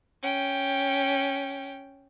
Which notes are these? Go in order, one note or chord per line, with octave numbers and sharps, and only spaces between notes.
C#4 G5